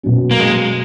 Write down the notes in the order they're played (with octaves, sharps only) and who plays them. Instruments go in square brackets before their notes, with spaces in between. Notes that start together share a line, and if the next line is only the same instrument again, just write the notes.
[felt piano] B2 F#3 C#4
[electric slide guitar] A#3
G#3